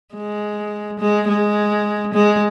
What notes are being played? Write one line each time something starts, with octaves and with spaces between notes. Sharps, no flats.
G#3
G#3
G#3
G#3